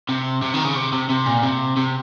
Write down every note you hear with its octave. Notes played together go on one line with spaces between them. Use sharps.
C3
C3
D#3
C#3
C3
C3
C3
A#2
C3
C3